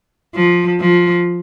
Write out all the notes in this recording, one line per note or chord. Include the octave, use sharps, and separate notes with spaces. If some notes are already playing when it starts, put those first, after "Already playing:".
F3
F3